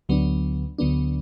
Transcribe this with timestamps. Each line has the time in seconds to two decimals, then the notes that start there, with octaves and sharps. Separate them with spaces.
0.09 D2 D3 F#3 B3 D4
0.78 D2 D3 F#3 B3 D4